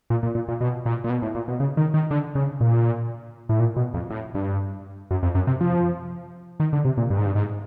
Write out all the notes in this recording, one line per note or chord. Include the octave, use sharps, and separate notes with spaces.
A#2
A#2
A#2
A#2
B2
A#2
A#2
B2
A2
A#2
B2
C#3
D#3
D#3
D3
C#3
A#2
A2
A#2
B2
F2
A2
G2
F#2
F2
F#2
C3
F3
D#3
D3
C3
A#2
G2
G#2
G2
G#2